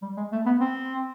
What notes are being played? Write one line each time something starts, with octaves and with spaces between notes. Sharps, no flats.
G3
G#3
A3
B3
C4